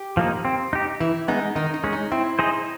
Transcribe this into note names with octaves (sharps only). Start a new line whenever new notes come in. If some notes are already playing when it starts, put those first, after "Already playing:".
Already playing: G4
F3 A#3 D#4
C4
D#4 G4
E3 E4
G#3 B3 D#4
D#3 D#4
D#4
G#3 C#4
D#4
C4 E4
D#4 G#4 C5 D#5